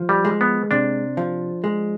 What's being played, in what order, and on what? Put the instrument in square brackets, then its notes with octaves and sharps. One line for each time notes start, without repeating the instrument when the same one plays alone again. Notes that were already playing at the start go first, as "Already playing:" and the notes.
Already playing: [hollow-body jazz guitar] F3
[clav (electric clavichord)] G3
[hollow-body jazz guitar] G#3
[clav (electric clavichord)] B3
[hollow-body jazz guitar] C3 [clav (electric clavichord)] D4
[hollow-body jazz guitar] F3
G#3